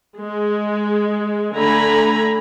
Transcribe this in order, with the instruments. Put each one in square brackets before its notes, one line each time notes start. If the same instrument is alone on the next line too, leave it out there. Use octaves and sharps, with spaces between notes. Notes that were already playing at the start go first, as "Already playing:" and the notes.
[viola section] G#3
D3 A3 G#5 A#5 B5